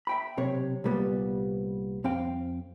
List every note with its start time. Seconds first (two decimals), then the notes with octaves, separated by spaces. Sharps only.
0.07 E5 G5 B5
0.37 B1 C3 C#5
0.84 C2 A#2 G3 B3
2.04 F2 C4 F5 G5